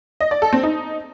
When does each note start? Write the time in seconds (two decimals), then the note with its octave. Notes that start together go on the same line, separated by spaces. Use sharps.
0.20 D#5
0.31 D5
0.42 A4
0.53 C4
0.63 D#4